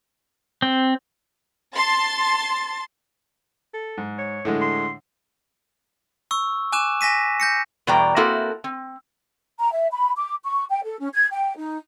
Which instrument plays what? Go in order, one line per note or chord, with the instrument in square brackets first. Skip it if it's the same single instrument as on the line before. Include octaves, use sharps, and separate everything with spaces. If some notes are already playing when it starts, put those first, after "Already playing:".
[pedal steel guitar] C4
[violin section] A5 C6 A6
[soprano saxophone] A4
[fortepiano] G#2
[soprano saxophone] C#5
[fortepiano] A2 D3 G#3
[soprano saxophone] C6
[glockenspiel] C#6 E6
G#5 D6 F#6 E7
G#5 A#6 B6 D#7
G6 A#6 C#7
[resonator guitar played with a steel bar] E2 B2 G3 D5 G5 A#5
A#3 C4 E4 F#4 A4 A#4
C4
[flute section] A#5
E5
B5
D6
C#6
G5
A4
C#4
G#6
G5
D#4